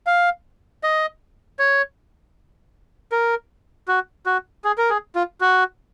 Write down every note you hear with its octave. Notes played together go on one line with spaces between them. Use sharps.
F5
D#5
C#5
A#4
F#4
F#4
G#4
A#4
G#4
F4
F#4